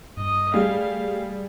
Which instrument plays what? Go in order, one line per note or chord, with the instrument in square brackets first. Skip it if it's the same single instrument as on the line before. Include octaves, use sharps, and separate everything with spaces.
[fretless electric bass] G2 [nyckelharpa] D#5
[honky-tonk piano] G3 G#4 [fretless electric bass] A3 [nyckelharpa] F5